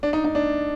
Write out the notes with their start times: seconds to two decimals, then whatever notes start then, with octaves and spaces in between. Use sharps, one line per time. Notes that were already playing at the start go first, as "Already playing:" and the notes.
0.03 D4
0.13 D#4
0.24 D#4
0.35 D4